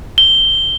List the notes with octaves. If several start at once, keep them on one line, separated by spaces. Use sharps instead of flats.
G7